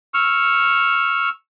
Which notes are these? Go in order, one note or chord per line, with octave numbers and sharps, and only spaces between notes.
C#6 E6 F6